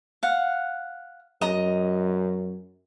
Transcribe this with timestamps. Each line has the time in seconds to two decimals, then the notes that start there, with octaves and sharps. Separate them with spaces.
0.23 F5 F#5
1.41 F#2 D#5 A#5 D#6